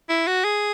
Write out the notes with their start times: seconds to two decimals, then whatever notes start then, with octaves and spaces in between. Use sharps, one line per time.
0.09 E4
0.27 F#4
0.44 G#4